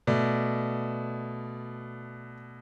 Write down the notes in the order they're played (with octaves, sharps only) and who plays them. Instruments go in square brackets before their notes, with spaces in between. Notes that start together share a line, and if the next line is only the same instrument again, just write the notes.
[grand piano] B2 A3 D5